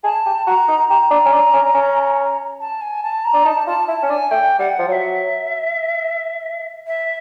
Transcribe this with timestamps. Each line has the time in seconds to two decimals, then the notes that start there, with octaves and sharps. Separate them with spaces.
0.04 G#4 A5
0.26 G4
0.47 F#4 A#5
0.68 D#4
0.90 G4 A#5
1.11 D4
1.25 C#4
1.33 D4
1.54 C#4
1.74 C#4
2.60 A5
2.81 G#5
3.03 A5
3.25 A#5
3.34 D4
3.45 D#4 A5
3.67 F4 A5
3.88 E4 A5
4.03 C#4
4.09 D4 G#5
4.31 A3 G5
4.59 G3 F#5
4.79 F3
4.88 F#3 E5 F#5
6.87 E5